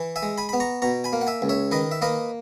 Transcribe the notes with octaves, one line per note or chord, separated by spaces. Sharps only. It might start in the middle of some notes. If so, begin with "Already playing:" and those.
Already playing: E3
E5 G#5
G#3
G#5 B5
B3 B5
A#5 C#6
B2 A#5 C#6
G#5 B5
A#3
F#5
E5 G#5
C#2
C#5 E5
D#3 B4 D#5
E5
A#3 B4 D#5